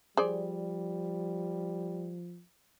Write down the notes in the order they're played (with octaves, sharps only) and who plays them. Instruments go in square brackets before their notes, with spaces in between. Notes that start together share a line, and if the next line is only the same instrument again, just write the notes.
[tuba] F3 [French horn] G3 [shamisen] G#4 C5 D5